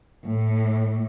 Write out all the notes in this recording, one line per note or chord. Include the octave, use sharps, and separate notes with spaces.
A2